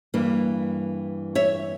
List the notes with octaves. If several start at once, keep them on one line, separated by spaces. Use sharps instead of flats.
G2 E3 A#3
C#5 E5